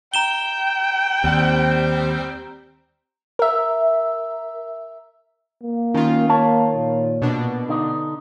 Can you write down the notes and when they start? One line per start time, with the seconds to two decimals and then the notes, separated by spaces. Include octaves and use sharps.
0.14 G5 A#5 E7 G7
1.24 D#2 G3 C4
3.39 A#4 E5
5.62 A#3
5.94 D#3 C#4 F4
6.29 A#3 C#5 A5
6.75 A#2
7.22 B2 D4
7.69 D3 D#4